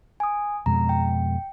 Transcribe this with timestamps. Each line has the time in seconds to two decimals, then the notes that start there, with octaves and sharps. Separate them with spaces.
0.20 G#5 D#6
0.66 F2 B2 G#3 A#5
0.89 G5